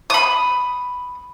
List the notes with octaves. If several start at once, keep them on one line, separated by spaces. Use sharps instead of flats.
B5 D#6